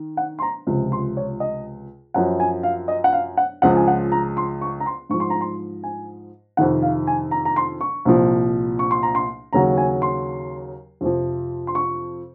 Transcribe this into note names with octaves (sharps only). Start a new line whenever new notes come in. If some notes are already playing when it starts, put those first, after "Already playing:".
Already playing: D#3
F#5
C6
A#5
C#2 C3 F3
C6
C#5
D#5
F#2 F3 F#5
G#5
F5
D#5
F#5
F5
F#5
C#2 C#3 F3 F#5
G#5
F#5
A#5
C6
C#6
A#5
C6
G#2 F3 C#6
C6
A#5
C6
G#5
F2 C3 D#3 F#5
F5
G#5
A#5
A#5
C6
C#6
C2 A#2 F3
C#6
C6
A#5
C6
D#2 C#3 F#3 A#5
G#5
C6
F2 C3 F3
C6
C#6